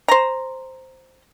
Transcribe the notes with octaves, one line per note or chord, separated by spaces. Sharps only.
C5 A#5